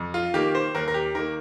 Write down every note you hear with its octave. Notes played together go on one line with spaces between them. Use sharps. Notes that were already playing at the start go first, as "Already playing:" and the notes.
Already playing: F2
F4
D#3 A#3 G4
C5
D#2 A#4
A#4
G4
D#3 A#3 A#4